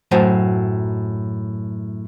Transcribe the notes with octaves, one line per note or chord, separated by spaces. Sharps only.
F#2 A2 F#3 C5 A5